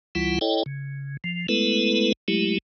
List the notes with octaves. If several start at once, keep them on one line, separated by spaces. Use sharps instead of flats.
C#2 E3 G3 E4 F4 F#5
E4 A4 C#5 D#5 G5
C#3
F3
G#3 A3 B3 E4 A4 B4
F#3 G#3 A3 E4 G4